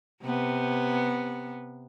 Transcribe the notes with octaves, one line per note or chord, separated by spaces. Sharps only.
C3 B3